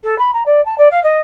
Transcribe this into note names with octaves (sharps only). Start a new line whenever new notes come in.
A4
B5
A#5
D5
A5
D5
F5
D#5